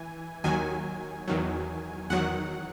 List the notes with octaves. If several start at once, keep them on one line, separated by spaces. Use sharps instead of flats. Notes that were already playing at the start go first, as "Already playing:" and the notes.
Already playing: E3 G#5
D#2 D#3 F#3 G#5
E2 D#3 F#3
E2 D#3 F#3 F#5